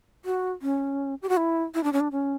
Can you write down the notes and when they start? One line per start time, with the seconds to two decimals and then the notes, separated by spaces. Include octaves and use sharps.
0.25 F#4
0.62 C#4
1.22 G4
1.29 F#4
1.37 E4
1.74 E4
1.84 D4
1.93 C#4
2.00 D4
2.12 C#4